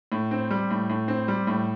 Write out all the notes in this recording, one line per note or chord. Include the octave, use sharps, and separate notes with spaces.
A2
C4
G3
A2
A2
C4
G3
A2